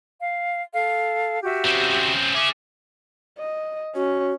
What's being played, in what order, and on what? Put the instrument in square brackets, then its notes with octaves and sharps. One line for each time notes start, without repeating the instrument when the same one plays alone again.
[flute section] F5
A4 F5
F#4 G4 E5
[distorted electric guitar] C#3 C4
[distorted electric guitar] C#4 G#4 [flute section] E5 D6
[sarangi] D#5
[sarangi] C#4 [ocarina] F#4